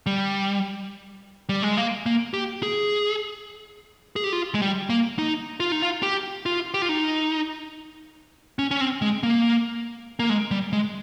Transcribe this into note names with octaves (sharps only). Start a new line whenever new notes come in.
G3
G3
G#3
A#3
A#3
G4
G#4
G#4
G4
F4
G#3
G3
A#3
D#4
F4
D#4
F4
G4
F4
G4
F4
D#4
C#4
C#4
C4
G#3
A#3
A#3
G#3
G3
G#3